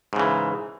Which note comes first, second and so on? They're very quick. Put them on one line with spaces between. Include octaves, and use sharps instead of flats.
G#2 C#3 E3